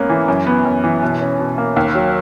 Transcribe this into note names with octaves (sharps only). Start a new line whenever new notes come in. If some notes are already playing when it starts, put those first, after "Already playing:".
Already playing: G#2 A#3 B3 C#4
E3
F#2
B3
F#2
E3
B2
C#4
B2
A#3
D#2
F#3